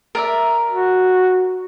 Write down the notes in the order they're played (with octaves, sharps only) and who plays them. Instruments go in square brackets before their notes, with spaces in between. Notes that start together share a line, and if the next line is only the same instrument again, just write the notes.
[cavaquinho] A#4 D5 E5
[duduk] F#4